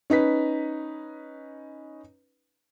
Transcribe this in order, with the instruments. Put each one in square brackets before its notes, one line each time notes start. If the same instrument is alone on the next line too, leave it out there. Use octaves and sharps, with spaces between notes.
[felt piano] C#4 D#4 B4 B6